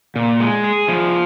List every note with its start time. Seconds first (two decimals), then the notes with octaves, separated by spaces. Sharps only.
0.16 A#2
0.40 G#3
0.64 G#4
0.88 F3